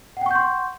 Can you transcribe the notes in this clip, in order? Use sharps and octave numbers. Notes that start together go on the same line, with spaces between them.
F#5 G5 C6 C#6 G6